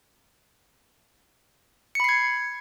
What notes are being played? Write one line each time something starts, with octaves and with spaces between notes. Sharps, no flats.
B5 G#6 C7 C#7